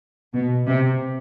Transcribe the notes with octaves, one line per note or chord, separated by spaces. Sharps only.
B2
C3